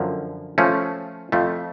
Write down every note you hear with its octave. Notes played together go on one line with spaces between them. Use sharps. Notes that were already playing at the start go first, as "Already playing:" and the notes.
Already playing: F#2 D3 F3
F3 A3 C#4
F2 F3 A3